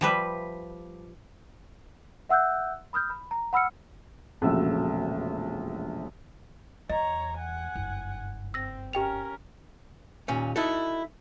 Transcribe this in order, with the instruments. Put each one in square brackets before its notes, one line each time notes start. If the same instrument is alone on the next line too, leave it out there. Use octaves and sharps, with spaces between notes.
[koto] F3 G3 B4 E5
[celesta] E5 F#5 E6 F#6 G6
B5 D#6 F6 G6
B5
A#5
F#5 B5 E6 F6 C#7
[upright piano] E1 A#1 C#3 A3 F#4 E6
[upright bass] E2 [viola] C#5 A#5 [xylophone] D#5
[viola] F#5 G#5
[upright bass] F#1 G2
[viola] C4 [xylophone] E6 A#6
[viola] C#4 A#4 [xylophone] G4 G5 F7
[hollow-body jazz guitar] D#2 A#2 C#4
D#4 E4 F#4 A4